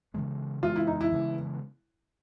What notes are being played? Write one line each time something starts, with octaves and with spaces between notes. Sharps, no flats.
C#3 E3 G#3 B3
C#3 E3 G#3 B3 F4
E4
D#4
E4
C#3 E3 G#3 B3